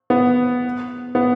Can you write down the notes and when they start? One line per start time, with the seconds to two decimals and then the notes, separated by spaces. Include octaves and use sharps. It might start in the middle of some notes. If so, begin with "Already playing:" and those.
0.10 B3
1.15 B3